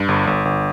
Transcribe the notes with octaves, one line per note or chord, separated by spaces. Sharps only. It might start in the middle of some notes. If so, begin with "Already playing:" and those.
Already playing: G2
G1
G1
G1